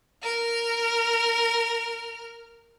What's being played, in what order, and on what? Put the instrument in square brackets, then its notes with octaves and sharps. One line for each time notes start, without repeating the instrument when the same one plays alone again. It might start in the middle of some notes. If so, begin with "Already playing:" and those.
[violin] A#4 F6